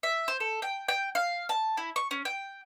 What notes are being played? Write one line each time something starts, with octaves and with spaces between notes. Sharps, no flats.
E5
C5
A4
G5
G5
F5
A5
E4
C#6
C#4
G5